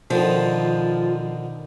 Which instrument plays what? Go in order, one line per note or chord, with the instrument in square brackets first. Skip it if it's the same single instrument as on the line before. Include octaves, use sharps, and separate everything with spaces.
[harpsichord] B2 D3 D#3 [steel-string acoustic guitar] F3